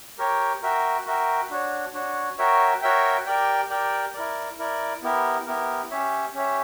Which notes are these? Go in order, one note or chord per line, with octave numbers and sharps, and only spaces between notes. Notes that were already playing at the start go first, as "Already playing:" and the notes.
G4 A#4 C#5 G5
F#4 A#4 E5 G5
F#4 A#4 E5 G5
D4 F#4 C#5
D4 F#4 C#5
F#4 A#4 C#5 E5 G5
F#4 A#4 C#5 E5 G5
G4 A#4 D5 G5
G4 A#4 D5 G5
E4 A#4 D5
E4 A#4 D5
B3 E4 G4 A#4
B3 E4 G4 A#4
C#4 G4 C#5 E5
C#4 G4 C#5 E5